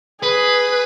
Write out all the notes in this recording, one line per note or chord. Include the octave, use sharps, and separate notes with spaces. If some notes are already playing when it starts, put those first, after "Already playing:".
G#4 B4